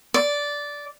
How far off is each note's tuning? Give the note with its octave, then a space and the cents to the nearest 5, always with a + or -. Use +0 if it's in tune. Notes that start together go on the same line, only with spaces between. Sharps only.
D5 -10